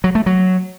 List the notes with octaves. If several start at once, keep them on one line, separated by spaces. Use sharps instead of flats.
F#3
A3
F#3